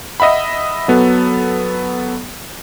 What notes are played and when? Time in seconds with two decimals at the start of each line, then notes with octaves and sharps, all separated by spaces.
0.20 D#5 E5 F#5 B5
0.88 F#3 B3 A4